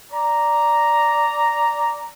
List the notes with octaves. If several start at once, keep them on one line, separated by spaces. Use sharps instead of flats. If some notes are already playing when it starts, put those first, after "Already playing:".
D5 A#5